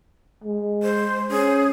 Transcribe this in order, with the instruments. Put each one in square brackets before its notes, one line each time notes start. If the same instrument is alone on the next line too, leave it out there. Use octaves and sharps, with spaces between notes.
[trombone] G#3
[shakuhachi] C5
[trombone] C#4 [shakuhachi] G#4